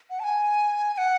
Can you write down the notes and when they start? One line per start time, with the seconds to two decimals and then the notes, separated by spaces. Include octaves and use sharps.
0.10 F#5
0.20 A5
0.24 G#5
0.94 G#5
0.98 F#5